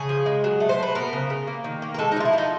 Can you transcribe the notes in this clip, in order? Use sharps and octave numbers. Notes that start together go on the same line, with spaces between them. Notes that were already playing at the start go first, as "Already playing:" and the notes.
Already playing: C#3 G#4
F3
G#3
F#3
A3
C5
A3 B4
B3 A#4
C#3
C#3
A#3
D#3
A#3
A#4
G#3 A4
D#4
F3 F4
E4
F3 D#4